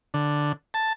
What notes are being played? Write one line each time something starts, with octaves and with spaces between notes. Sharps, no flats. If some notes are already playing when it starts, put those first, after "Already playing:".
D3
A5